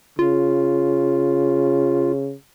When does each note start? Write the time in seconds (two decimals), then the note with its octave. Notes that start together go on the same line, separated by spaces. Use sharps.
0.19 C#3 F4